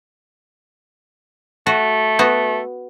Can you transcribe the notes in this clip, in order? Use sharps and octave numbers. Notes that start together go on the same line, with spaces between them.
A3 F#4
B3 F#4